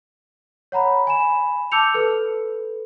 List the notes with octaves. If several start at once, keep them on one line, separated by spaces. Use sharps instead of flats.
C#5 F#5 A#5 B5
G#5 B5 E7
A5 D6 E6 G6 C#7 F7
A4 B4